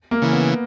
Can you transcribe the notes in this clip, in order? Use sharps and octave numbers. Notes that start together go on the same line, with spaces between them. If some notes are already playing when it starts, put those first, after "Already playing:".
A#3
C#3 E3
B3